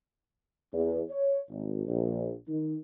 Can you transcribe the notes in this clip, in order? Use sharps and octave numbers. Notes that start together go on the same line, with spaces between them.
E2
C#5
G#1
A#1
D#3